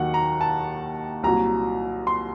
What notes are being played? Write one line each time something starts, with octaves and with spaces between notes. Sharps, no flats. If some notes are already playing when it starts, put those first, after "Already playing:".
Already playing: D#2 D#3 F#3 F#5
A#5
A5
C2 A#2 F#3 A#5
C6